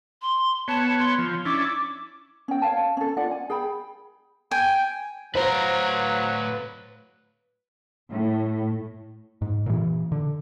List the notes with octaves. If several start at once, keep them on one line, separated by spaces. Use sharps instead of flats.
C6
B3 C#5 A5
C6
F3
C#4 D4 E4 D6
C#4 G5
C#5 F5 A5
C#4 A4
D4 F4 D5 F#5
G#5
G#4 G5 B5
G5 G#5
A2 F#3 B4 C5 F5 A#5
A2
G#2
A#2 E3
D3